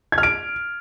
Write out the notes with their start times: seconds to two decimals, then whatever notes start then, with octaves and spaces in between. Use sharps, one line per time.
0.12 G#6
0.18 F6
0.23 D7